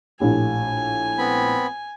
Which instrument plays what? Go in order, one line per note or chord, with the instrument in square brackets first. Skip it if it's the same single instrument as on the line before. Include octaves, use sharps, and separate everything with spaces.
[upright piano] A#1 A2 G4 [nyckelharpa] G#5
[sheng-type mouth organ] B3 C4 B5